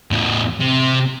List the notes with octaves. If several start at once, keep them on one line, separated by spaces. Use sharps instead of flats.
E2 A2
C3